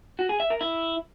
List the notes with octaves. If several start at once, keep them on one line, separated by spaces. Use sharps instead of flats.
F#4
G#4
E5
A#4
E4